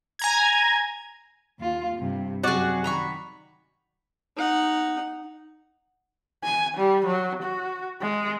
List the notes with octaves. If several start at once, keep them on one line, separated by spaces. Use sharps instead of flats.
G#5 A#5 G#6
D#2 F4
G2 C3
F#2 C3 F#4 G#4 D5 F#5
D#3 A#5 B5 C#6
D#4 F#5
G#5
G3
F#3
F#4
G#3